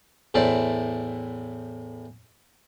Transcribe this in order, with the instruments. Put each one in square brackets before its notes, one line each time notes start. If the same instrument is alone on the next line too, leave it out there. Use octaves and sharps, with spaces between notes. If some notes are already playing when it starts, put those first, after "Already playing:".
[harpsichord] E2 A2 E3 A4 C5 D5